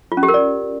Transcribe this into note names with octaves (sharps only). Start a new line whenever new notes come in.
F4
C#4
G4
A#4
D5